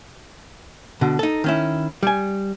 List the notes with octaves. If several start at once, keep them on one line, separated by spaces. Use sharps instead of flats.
B2 D3
D#4 A4
D#3 C#4 E4
G3 G#5